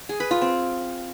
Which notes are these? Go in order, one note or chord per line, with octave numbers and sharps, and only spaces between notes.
G#4
B4
F4
C4